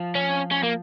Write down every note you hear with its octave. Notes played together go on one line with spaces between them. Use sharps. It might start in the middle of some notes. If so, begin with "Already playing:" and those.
Already playing: F3
C#4
C#4
A#3